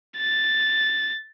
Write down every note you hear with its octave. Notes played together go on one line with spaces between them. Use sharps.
A6